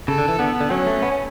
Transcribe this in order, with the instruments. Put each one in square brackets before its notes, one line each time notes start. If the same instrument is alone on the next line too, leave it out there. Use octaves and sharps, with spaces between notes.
[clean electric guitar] C#3 [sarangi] A4
[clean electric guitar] D3
E3
[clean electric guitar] D3 [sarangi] B3
[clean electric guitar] D3
[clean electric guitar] F#3 [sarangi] C#4
[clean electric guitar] A3
B3
C#4